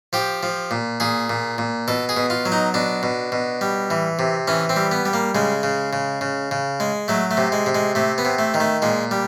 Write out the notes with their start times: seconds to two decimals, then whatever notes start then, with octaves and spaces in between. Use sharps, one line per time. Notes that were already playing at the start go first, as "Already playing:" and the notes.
0.13 F3 G4
0.43 F3
0.71 A#2
1.00 A#2 G#4
1.30 A#2
1.58 A#2
1.88 B2 A4
2.09 G#4
2.17 B2
2.30 F4
2.46 F#3
2.52 D#4
2.74 B2 D4
3.03 B2
3.32 B2
3.61 G3
3.90 E3
4.19 C3
4.48 E3 C#4
4.69 C4
4.76 G3
4.92 B3
5.06 G3
5.13 A#3
5.35 C#3 G#3
5.63 C#3
5.93 C#3
6.21 C#3
6.51 C#3
6.80 G#3
7.08 F#3 A3
7.31 A3
7.37 C3
7.52 G#3
7.66 C3
7.75 G#3
7.95 C3 A3
8.18 B3
8.25 C3
8.39 A3
8.54 D#3
8.60 A3
8.82 A#2 G#3
9.11 G3